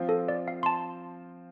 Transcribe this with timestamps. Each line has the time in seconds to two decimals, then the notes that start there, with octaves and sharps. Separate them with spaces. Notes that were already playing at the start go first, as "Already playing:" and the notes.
Already playing: F3 C4 F4
0.09 A4
0.28 D5
0.48 F5
0.63 C6
0.66 A5